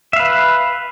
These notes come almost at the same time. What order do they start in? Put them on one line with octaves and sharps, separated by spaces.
E5 F5 B4